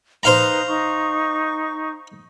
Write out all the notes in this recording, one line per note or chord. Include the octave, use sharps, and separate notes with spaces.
D#4 B4 C5 F5 A#5
D#4 C#6